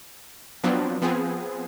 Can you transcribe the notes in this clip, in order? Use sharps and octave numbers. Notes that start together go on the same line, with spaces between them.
F3 F#3 B3 C4 D4
F3 B3 C4 G#4